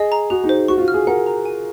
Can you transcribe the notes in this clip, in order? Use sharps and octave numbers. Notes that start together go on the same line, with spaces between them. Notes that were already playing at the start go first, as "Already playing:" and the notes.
Already playing: G#4 D#5
A#5
F#4 G#4
D#4
C5
F#4 C#6
F4
F#4
F6
G#4
A#4 F#5
A#5
G#5